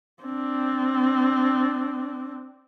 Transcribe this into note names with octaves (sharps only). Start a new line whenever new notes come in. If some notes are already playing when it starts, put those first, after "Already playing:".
C4 D4